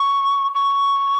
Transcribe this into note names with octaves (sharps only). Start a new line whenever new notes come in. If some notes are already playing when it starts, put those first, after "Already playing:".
Already playing: C#6
C#6